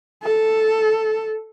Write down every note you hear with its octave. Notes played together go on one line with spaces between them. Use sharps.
A4